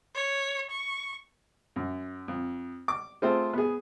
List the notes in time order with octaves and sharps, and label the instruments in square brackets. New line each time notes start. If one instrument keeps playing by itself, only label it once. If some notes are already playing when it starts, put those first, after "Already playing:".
[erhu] C#5
C#6
[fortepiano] F#2
F2
D6
A3 C4 F4 G#4 C5
B3 G#4